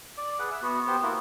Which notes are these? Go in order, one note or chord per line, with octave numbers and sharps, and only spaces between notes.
D5
G#4 B4 F#5
E5
B3 F#4
B3 G4 C5
A#3 E4 F#4